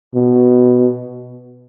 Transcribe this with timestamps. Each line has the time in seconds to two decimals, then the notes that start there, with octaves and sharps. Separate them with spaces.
0.15 B2